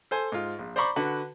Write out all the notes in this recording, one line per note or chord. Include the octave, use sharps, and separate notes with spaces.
A4 C5 G#5
G#2 F4
A#1
C5 D5 A#5 B5 C#6 D6
D3 F#4 B4